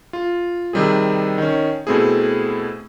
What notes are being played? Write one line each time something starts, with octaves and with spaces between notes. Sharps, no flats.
F4
C3 D#3 G3 C4 G#4
D#3 C#4
B2 A3 C4 E4 G#4